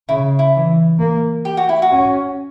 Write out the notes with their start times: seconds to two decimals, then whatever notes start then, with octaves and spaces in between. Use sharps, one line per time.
0.08 C#3 E4
0.39 E4
0.54 E3
0.99 A#3
1.45 G4
1.57 F#4
1.69 E4
1.82 F#4
1.91 C#4